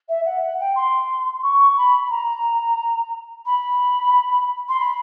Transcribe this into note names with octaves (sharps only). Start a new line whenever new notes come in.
E5
F#5
F#5
G5
C6
C#6
B5
A#5
B5
C6
B5